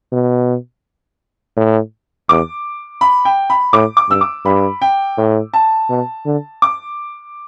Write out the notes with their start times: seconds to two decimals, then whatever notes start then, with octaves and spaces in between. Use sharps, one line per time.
0.12 B2
1.57 A2
2.29 E2 D6
3.01 B5
3.25 G5
3.50 B5
3.73 A2 D6
3.97 D6
4.09 G2 E6
4.21 D6
4.45 G2 B5
4.82 G5
5.18 A2
5.54 A5
5.90 B2
6.26 D3
6.62 D6